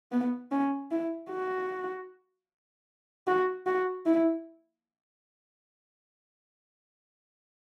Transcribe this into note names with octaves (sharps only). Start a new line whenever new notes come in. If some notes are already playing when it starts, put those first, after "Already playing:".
B3
C#4
E4
F#4
F#4
F#4
E4